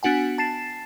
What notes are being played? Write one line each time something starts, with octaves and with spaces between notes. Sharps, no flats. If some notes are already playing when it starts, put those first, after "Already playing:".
B3 D4 F#4 F#5 G#5
A5 A6 C7 E7